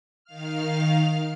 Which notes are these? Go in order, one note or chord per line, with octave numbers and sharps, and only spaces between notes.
D#3 F5 F6